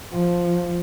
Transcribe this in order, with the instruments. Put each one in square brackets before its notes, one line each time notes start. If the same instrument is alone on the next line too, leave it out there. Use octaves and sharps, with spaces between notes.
[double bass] F3